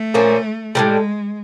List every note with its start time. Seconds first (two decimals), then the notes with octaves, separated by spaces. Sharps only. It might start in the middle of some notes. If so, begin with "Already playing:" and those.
Already playing: A3
0.14 A#2 F3 A#3 C#4
0.75 A2 E3 G3 G#3